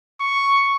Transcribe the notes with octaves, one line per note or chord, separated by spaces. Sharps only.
C#6